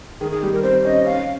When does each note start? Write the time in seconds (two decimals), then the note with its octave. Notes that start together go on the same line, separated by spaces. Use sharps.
0.21 D#3 G#4
0.31 G#4
0.42 G3 G4
0.53 A#4
0.63 C4 C5
0.85 C#4 D#5
1.05 C#4 F5